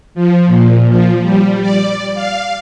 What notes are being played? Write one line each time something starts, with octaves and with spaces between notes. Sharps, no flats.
F3
A#2
F3
G3
D5
F5